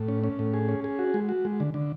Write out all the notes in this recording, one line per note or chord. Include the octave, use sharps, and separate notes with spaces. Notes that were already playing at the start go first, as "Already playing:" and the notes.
Already playing: A2
C#4
C#4
A2
G#4
C#4
G#4
F#4
G#3
F#4
G#3
D3
D3